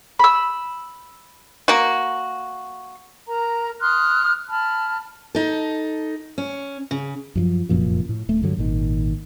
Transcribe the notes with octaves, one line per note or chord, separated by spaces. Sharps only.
B5 E6
A#3 F#4
A#4 A#5
C6 D#6 F6 F#6
A5 B5 F6
D#4 A4
C#4
C#3
F#2 E3 F3
F1 F#2 A#2 F3
A2
D1 A3
G2 D3 F#3
G#1 A#2 D#3